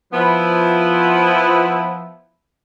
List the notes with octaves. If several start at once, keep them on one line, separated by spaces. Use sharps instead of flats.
F3 B3 E4